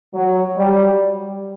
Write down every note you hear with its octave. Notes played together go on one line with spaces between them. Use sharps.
F#3
G3